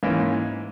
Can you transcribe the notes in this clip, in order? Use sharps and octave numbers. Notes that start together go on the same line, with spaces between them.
G#2 E3 A#3 C#4